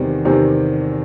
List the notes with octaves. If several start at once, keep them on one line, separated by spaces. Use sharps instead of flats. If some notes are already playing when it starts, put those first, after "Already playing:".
Already playing: E2 C3 D#3 G3 C4
E2 C3 D#3 G3 C4